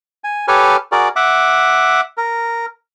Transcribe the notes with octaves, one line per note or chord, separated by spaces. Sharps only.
G#5
G4 A4 B4 C#5 G#5 F6
F#4 G#4 A#4 D5
E5 F#5 D6
A#4